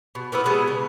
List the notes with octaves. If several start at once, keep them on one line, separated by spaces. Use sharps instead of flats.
B2
A#3 B3 E4 B4
B2 G3 G#3 B3
C#3